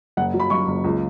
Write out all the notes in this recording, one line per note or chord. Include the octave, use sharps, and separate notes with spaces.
F#1 F#5
F#3
B5
F#2 C#6
F#1
C#2